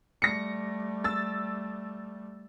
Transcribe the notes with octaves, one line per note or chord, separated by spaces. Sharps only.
G3 A3 A#6 C#7
E6 A6